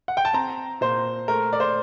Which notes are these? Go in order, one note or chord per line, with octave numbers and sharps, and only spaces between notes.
F#5
G5
A5
C4 A#5
A#2 C5
A3 A#4
D5
C5